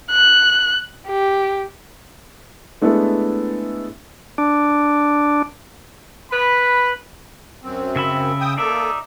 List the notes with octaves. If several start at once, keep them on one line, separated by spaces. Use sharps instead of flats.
F#6
G4
G#3 A3 B3 D4 E4 A4
D4
B4 B5
F#2 C4
C#3 E5 B5
G5 D#6
A#3 D#4 A4 D5 E5